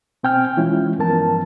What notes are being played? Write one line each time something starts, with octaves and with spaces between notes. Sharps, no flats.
B2 C4 G5 G#5 F6 G6
E3 G#3 C#4 E4 F4
G2 E3 F3 B3 A#4 A5